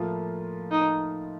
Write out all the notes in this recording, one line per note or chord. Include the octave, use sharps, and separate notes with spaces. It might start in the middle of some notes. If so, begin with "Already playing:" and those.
Already playing: A2 F3 A#3 F4
D#4